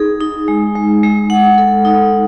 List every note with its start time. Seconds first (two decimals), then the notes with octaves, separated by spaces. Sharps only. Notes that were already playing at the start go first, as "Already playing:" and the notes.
Already playing: D#4 G#4
0.21 D#4
0.48 G#3
0.75 G#3
1.04 G#3
1.30 F#5
1.58 A4
1.85 D#4